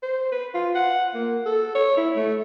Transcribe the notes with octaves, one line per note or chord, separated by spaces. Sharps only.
C5
B4
F4
F#5
A#3
A4
C#5
E4
A3